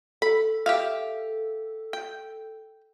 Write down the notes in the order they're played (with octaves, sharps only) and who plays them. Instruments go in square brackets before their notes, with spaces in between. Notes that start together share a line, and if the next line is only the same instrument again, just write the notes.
[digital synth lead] A4 [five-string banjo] B5
[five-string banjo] G4 E5 F5
G5